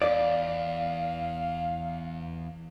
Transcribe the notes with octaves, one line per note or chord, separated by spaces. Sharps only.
E2 D5 F5